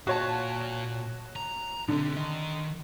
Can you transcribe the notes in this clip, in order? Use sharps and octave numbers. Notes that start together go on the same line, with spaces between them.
A#2 F#4 C#5 F5 A5
A#5
B2 D3 C4
D#3 D#5